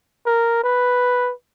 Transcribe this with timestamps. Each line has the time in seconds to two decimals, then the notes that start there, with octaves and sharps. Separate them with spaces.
0.26 A#4
0.64 B4